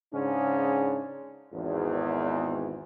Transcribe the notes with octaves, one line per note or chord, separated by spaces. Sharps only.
G#2 C#3 C#4 D4
G#1 E2